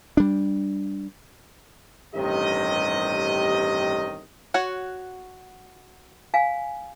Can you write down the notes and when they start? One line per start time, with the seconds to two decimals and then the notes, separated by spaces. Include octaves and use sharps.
0.17 G3 D4
2.15 A1 G2 C3 D#3 G4 D#5
4.54 F#4 C#5 F#5
6.34 F5 G#5